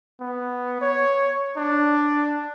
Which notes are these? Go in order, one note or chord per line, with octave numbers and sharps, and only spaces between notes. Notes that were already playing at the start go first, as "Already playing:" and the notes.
B3
C#5
D4